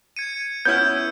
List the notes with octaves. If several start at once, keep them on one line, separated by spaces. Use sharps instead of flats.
G#6 C#7 D#7
B3 C#4 E4 F6 G6 G#6